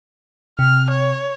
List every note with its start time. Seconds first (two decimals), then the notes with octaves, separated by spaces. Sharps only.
0.59 C3 F6
0.90 C#5